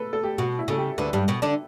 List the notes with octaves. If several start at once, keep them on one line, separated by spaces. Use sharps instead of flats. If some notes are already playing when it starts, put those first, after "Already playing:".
Already playing: A4 B4
A4
G4
B2 F#4
E4
C#3 A4
G4
D2 D3 B4
G2 G3
B2 B3
D3 D4